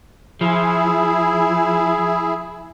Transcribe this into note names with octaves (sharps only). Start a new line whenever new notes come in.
F3 E4 G#4